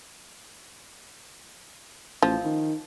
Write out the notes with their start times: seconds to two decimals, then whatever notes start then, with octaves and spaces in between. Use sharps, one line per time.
2.22 A1 F3
2.45 D#3